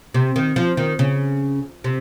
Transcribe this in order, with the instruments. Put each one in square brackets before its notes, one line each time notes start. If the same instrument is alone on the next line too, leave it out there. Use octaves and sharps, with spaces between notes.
[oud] C3
D#3
F3
D#3
C#3
C3